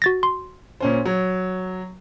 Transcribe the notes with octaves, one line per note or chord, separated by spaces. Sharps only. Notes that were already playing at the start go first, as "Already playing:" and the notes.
F#4 A6 A#6
C6
A#2 C#4 C5
F#3